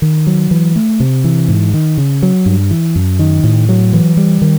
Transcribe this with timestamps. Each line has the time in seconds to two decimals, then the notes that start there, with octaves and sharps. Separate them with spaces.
0.02 D#3
0.27 F#3
0.51 E3
0.76 A3
1.00 C3
1.24 E3
1.48 G#2
1.74 D#3
1.97 C#3
2.23 F#3
2.46 G2
2.71 E3
2.96 F#2
3.19 D#3
3.44 A2
3.69 F#3
3.93 E3
4.17 G3
4.42 D#3